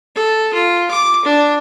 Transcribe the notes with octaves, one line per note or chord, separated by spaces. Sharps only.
A4
F4
D6
D4